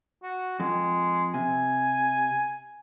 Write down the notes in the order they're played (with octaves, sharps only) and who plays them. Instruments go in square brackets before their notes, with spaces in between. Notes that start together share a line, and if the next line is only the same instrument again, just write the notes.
[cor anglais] F#4
[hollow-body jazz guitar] F2 [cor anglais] G#3
[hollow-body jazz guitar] C3 [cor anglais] G#5